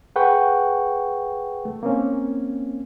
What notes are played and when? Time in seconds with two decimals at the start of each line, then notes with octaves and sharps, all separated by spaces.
0.16 G#4 B4 F#5 G5 C#6
1.65 A3
1.83 A#3 C4 C#4